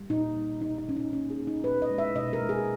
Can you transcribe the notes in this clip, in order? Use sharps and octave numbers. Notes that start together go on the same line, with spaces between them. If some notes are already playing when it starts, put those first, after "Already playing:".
Already playing: G3
A#2 D#4
G3
B2 D#4
D#4
G3 C#4
D#4
A#3 C#4
G#4
A#3
D#4
A#2 B4
D#5
G#3
E5
B2 D#5
A#4
G#3
G#4